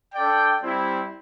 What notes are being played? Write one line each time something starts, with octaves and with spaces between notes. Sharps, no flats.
D4 A4 D5 G5
G3 C4 E4